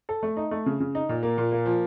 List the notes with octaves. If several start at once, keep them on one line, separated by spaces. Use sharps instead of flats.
A4
A3
D#4
A3
C#3
C#3
D#4
A#2
A#3
A#2
A#3
F3